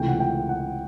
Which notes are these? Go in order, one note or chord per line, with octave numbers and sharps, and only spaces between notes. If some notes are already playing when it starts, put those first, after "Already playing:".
Already playing: C#2 C3 E3 A3 G5
F#5
G5
F#5